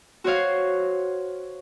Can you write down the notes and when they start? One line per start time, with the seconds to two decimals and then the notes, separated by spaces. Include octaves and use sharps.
0.24 F#4 C5 C#5 F5